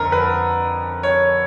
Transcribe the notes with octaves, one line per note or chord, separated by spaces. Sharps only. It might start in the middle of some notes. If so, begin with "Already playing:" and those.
Already playing: F2 D3 A#4
B4
C#5